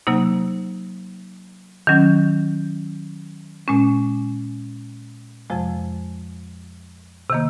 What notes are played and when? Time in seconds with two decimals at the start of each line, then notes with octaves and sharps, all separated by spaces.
0.07 C3 F#3 A#3 D#4
1.87 D#3 F#3 C#4
3.68 A#2 G#3 C#4
5.50 F2 C3 F3 G#3
7.30 C3 D#3 A#3